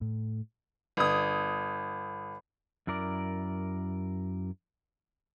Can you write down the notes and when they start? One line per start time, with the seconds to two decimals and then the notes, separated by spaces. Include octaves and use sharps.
0.01 A2
0.97 G1 D#6
2.87 F#2 E4 A#4 D5